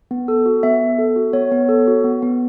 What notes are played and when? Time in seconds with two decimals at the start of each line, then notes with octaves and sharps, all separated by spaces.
0.11 B3
0.28 A4
0.46 F#4
0.63 B3 E5
0.81 B3
0.99 A4
1.16 F#4
1.33 B3 C#5
1.52 B3
1.69 A4
1.87 F#4
2.04 B3
2.22 B3